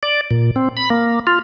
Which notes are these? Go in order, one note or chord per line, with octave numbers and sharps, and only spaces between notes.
D5
A#2
C4
B5
A#3
F4